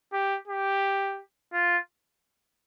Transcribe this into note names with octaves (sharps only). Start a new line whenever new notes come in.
G4
G4
F4